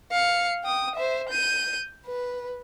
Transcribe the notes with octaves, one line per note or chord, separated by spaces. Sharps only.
F5 C#7
G5 D#6
C5 E5
G6 D#7
B4